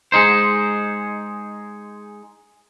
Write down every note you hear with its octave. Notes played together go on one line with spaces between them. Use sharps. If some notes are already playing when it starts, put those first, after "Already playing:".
G#3 D#4 C5